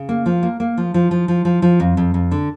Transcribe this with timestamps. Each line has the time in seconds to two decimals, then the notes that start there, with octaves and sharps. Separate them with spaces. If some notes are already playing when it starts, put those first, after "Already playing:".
Already playing: C#3
0.09 A#3
0.26 F3
0.43 A#3
0.60 A#3
0.77 F3
0.94 F3
1.11 F3
1.28 F3
1.45 F3
1.62 F3
1.80 F2
1.97 F2
2.14 F2
2.32 D3